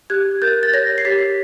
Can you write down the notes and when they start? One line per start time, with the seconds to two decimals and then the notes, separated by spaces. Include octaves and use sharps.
0.10 G4 F#6 G#6
0.42 A#4 G6 A6
0.63 A6
0.73 C#5 G#6 A#6
0.98 C7
1.05 G4 A6 B6